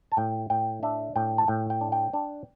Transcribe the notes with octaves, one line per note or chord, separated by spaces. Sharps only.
A5
A2 G5
A2 G5
D4 E5
A2 G5
A5
A2 G5
G5
D4
G5
D4